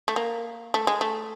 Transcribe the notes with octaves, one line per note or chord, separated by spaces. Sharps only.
A3
A#3
A3
G#3
A3